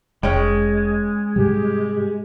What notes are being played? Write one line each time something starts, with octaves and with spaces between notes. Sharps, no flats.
F1 G#3 C#4 C#5 G5
G#2 C3 G3 G4